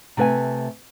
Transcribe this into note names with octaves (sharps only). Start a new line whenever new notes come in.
C3 A3 B4 F5 G#5